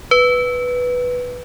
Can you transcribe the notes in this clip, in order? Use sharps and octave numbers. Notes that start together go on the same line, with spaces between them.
B4